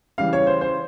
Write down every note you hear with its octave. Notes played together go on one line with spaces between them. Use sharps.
C#3 E3 G3 F5
C#5
C5
C5